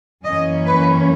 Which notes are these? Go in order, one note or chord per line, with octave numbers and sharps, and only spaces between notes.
F#2 E3 A#3 C#4 D#5
B4